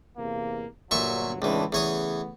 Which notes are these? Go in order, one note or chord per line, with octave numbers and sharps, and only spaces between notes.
E2 C3 A#3
G1 A#2 F#3 E5 C#6
C#2 A2 E3 C4 D4
E2 C#3 A3 B3 C#5 D#6